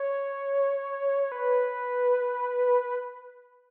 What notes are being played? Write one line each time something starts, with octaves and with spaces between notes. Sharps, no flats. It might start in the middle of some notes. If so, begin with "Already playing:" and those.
Already playing: C#5
B4